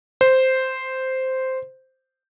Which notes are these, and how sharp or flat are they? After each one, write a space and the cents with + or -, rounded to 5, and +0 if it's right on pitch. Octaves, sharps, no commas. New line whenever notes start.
C5 -5